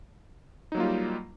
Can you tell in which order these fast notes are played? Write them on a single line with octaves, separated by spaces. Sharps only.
D#4 F#3 A#3 F4 G3